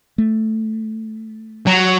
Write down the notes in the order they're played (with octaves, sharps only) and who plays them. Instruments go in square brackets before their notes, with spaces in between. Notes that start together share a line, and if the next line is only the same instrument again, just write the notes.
[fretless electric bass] A3
[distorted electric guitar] F#3